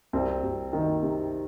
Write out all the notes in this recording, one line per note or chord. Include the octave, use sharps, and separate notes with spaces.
C2 C4
C2
D#3
C3